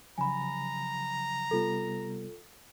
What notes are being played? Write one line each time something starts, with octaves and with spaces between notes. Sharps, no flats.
C#3 F3 F#3 G#5 A#5 B5
C3 G3 B3 F4 A4